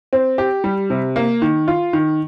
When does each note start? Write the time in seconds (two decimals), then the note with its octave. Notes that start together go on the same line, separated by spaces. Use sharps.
0.13 C4
0.38 G4
0.64 G3
0.90 C3
1.16 A#3
1.42 D#3
1.68 F4
1.93 D#3